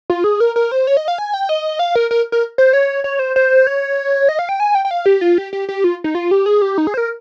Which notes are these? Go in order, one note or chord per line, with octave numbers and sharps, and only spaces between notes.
F4
G#4
A#4
A#4
C5
C#5
D#5
F5
G#5
G5
D#5
F5
A#4
A#4
A#4
C5
C#5
C#5
C5
C5
C#5
D#5
F5
G5
G#5
G5
G5
F5
G4
F4
G4
G4
G4
F4
D#4
F4
G4
G#4
G4
D#4
G#4
C5
A#4